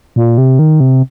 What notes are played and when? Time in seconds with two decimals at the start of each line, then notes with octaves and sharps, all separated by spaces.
0.16 A#2
0.38 C3
0.59 D#3
0.80 C3